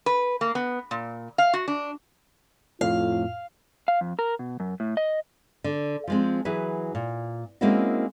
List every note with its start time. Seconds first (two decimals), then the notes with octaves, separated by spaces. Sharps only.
0.06 B4
0.41 A#3
0.55 B3
0.91 A#2
1.38 F5
1.53 F#4
1.68 D4
2.81 F2 A2 F4 F5
3.88 F5
4.01 F2
4.19 A#4
4.39 B2
4.60 F#2
4.80 A2
4.97 D#5
5.64 D3
6.08 F3 G#3 C4
6.45 E3 F#3 G#4 B4
6.95 A#2
7.61 G#3 A#3 C4 C#4 E4 F#4